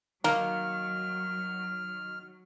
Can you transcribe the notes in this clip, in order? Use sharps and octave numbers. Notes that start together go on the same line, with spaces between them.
D#3 F#3 A#3 F6